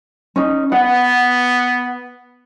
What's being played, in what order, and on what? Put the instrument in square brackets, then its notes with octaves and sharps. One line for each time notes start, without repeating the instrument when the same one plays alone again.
[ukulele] C#4 D#4
[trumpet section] B3 [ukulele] F#5